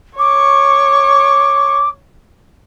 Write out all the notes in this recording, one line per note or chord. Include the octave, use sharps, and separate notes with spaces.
C#5 C#6 D6